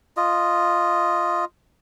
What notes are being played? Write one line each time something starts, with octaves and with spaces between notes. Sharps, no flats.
F4 D#5